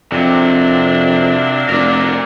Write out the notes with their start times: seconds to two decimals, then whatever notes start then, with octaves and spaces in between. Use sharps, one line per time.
0.12 F2 C3 F#3 A#3 D4
1.69 F1 A#4 D5